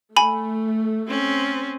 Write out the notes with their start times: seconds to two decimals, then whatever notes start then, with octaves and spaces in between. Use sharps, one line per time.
0.17 A3 G#5 B5
1.07 C4 C#4